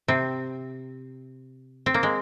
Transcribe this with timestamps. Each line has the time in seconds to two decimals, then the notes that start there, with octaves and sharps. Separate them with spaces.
0.08 C3 C4
1.86 C4
1.94 A#3
2.03 G#3